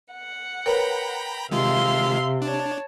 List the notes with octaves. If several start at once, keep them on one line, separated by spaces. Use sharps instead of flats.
F#5
A#4 B4 C#5 G5 A#5 B5
C3 D#3 G#3 F4 E5 F5 C6
D4 C#5 A5